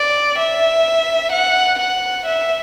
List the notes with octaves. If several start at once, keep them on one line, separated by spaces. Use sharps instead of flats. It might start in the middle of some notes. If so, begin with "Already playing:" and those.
Already playing: D5
E5
F#5
F#5
E5